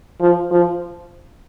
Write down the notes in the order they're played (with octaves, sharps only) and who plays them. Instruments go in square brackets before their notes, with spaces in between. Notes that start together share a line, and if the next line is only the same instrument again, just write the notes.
[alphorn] F3
F3